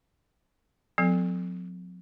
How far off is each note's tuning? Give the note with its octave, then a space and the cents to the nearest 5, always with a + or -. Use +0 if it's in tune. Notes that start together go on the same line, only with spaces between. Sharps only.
F#3 -45 C4 -40 A4 -10